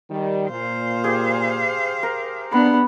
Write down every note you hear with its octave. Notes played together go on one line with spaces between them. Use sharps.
D#3 G3
A#2 C5 F5
G4 G#4
A#4
B3 D4 B5